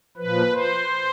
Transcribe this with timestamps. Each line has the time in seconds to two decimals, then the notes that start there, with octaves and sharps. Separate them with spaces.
0.17 F3 B4
0.23 A#2
0.53 C5